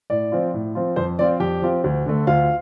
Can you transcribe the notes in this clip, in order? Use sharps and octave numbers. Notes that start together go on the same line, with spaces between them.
A2 D5
F3 C4 F4
A2
F3 C4 F4
F2 C5
F3 C4 F4 D5
F2 G4 G5
F3 C4 F4
D2
D3 A3
D2 F4 F5